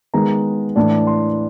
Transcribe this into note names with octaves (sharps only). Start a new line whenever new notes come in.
D#3 G#3 B3 A#5
A2 E3 A3 D4
C6